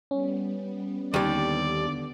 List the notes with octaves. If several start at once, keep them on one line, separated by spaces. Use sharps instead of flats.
G3 B3 C#4
D#2 D3 G3 B3 D5